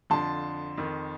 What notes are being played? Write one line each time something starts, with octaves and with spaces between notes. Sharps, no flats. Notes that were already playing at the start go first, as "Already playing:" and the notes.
F2 D3 F3 A5 C6
F2 D#3